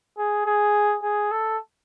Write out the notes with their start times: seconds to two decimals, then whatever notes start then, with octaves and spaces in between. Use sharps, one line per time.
0.17 G#4
0.46 G#4
1.03 G#4
1.31 A4